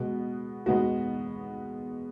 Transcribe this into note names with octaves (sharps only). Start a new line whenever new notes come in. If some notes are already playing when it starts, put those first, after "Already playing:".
Already playing: B2 G#3 B3 F#4
B2 G#3 B3 F#4